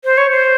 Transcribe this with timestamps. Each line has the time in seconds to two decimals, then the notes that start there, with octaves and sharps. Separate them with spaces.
0.04 C5
0.18 C#5
0.31 C5